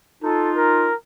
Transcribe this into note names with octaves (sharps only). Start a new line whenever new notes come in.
D#4 F4 A4
A#4